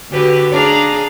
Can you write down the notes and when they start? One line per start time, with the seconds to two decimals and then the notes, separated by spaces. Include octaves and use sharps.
0.11 D3 F#4 G4 B4
0.52 D4 G#4 F5 A#5